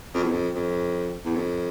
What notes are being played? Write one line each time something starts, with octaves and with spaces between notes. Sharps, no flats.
F2
E2
F2
F2
E2
F2